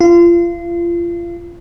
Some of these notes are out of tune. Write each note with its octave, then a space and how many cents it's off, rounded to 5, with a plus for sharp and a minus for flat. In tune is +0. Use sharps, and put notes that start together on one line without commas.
F4 -30